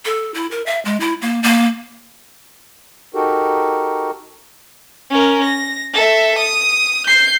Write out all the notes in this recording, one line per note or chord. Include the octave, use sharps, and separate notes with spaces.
A4
E4
A#4
E5
G#3
E4
A#3
A#3
D#4 F#4 G4 A4 A#4
C#4 A#4
A#6
A4 E5
D#6
G6 C7